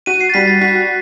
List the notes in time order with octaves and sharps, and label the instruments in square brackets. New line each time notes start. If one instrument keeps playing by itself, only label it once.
[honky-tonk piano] F#4 [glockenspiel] D#7
[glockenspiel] C7
A6
[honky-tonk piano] G3 [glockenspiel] B6
[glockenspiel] A6
[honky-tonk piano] F#4 [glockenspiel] B6